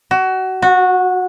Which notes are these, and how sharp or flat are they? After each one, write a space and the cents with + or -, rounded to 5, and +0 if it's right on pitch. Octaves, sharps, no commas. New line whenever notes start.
F#4 +25
F#4 -15